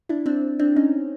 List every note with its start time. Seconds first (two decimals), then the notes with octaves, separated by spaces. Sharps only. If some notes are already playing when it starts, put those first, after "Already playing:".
0.09 D4 E4
0.26 C4 D4
0.59 C4 D4
0.76 C#4 D#4